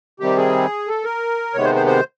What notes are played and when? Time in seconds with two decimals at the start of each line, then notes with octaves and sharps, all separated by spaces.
0.20 C3 D#3 G3 C4 G4
0.37 G#4
0.87 A4
1.04 A#4
1.54 C3 D#3 G#3 B3 C#5
1.64 C5
1.75 C5
1.86 C5